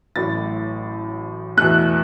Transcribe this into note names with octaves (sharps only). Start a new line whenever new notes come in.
A1 A2 F#3 A6
E2 B2 A3 F#6